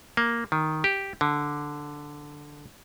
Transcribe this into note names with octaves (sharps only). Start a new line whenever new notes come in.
A#3
D#3
G4
D3